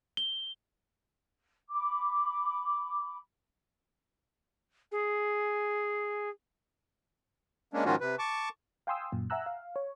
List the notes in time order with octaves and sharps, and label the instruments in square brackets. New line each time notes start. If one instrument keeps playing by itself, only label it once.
[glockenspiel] G7
[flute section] B5 D6
[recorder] G#4
[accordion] G#3 A#3 C#4 D4
G#2 D#3 F3 C#4 F4 F#4
C3 B4
A5 C#6 D6
[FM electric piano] F5 G5 G#5 C6 D#6 E6
F#2 A#2
E5 F#5 G#5 A#5 E6 F#6
F5
C#5